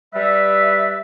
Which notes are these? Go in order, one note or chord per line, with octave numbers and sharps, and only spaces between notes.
G3 B4 E5